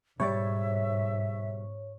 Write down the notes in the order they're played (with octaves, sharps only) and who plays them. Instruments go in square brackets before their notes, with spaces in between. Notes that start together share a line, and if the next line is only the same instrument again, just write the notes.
[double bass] G#2 [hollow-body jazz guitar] B2 G3 D5 [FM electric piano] C#5 [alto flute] E5